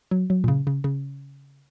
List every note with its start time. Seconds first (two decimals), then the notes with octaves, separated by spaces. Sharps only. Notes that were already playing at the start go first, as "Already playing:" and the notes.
0.11 F#3
0.30 F#3
0.44 A#2
0.48 C#3
0.67 C#3
0.84 C#3